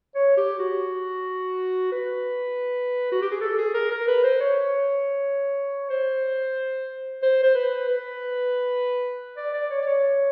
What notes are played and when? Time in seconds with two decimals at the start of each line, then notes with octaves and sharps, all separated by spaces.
0.15 C#5
0.37 G4
0.59 F#4
1.92 B4
3.12 F#4
3.22 G4
3.31 G#4
3.41 A4
3.58 G#4
3.74 A#4
3.91 A#4
4.07 B4
4.23 C5
4.40 C#5
5.90 C5
7.22 C5
7.43 C5
7.55 B4
7.88 B4
9.37 D5
9.54 D5
9.70 C#5
9.82 D5
9.87 C#5